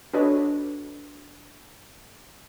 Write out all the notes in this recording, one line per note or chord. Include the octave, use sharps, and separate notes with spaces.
D4 F#4 A4 B4 C#5 D#5